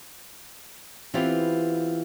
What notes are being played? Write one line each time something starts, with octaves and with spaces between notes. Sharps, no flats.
E3 B3 C4 F4 G4